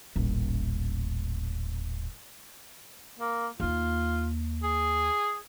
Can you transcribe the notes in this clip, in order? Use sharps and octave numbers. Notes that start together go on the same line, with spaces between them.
D#1 A1
A#3
D#2 A#3 F4
G#4